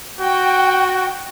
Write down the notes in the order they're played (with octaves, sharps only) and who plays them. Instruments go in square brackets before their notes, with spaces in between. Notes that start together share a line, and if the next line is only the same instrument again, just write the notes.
[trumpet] F#4 [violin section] G5